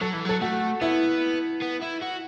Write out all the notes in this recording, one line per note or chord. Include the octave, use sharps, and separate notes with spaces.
F#3 A4
E3
F#3 A4
A3 F#4
B3 E4
B3
E4
F#4